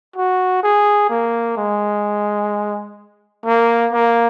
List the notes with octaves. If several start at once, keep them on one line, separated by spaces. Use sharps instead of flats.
F#4
G#4
A#3
G#3
A#3
A#3